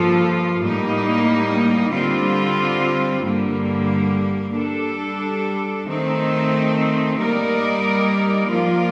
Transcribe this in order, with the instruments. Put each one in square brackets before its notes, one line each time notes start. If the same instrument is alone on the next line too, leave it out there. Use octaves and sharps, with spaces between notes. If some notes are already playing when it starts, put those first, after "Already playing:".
Already playing: [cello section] G2 F3 A#3 F4 A4
A2 G3 A#3 D#4
D3 G3 C4 F4
G2 D3 G3 A#3
G3 D4 A4
D#3 A3 C4 D#4
G3 A#3 D#4 A#4 D5
F3 A#3 F4 A#4 D5